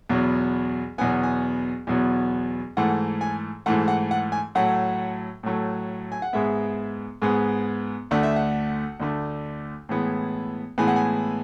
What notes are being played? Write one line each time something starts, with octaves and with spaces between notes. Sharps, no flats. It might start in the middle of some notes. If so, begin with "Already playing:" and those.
E2 B2 F#3
E2 B2 F#3 B3 G#5
G#5
E2 B2 F#3 B3
G#2 E3 A3 F#5
G#5
G#2 E3 A3 F#5
F#5
F#5
G#5
A2 F#3 A3 F#5
A2 F#3 A3
G#5
F#5
G#2 G#3 B3 E5
G#2 G#3 B3
D2 D3 A3 F#5
E5
F#5
D2 D3 A3
A2 E3 G#3 B3
A2 E3 G#3 B3 G#5
F#5
G#5